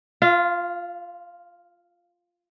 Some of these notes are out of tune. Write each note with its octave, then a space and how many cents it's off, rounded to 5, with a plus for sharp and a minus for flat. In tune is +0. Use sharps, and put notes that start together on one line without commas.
F4 +0 F5 -40